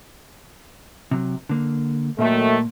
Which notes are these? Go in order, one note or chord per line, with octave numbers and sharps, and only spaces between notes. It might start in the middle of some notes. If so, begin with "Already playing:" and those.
C3 F#3
D3 A#3
A#2 D#3 F#3 A3 A#3